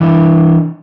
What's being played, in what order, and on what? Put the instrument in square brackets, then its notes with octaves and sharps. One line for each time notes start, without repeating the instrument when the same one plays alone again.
[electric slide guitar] E3 D4 E4